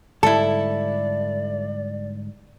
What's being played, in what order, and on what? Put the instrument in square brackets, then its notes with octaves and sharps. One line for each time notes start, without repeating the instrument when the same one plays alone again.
[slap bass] G#2 D3 G3 [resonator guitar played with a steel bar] E4 A4 [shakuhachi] D5 [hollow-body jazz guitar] A5